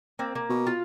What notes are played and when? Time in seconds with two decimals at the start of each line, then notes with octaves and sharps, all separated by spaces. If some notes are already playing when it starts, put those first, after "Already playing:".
0.19 A#3 C4
0.35 A#3
0.49 B2
0.67 F4